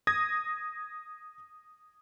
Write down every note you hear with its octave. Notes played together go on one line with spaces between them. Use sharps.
D#6 G#6 A#6